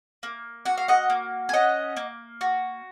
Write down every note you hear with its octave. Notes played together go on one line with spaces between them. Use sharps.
A#3
F#4 F#5
F5
D#5 F#5
A#3
G#5
C#4 D#5 F#5
A#3
F#4